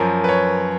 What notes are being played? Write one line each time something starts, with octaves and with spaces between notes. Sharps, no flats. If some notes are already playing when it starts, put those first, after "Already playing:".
Already playing: F#2 F3 A#4
B4
C#5